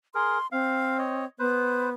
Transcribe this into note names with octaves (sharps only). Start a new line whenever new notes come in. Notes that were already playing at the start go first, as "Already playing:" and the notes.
G#4 A#4 C6
C4 F5
C#5 D#5
B3 B4 C5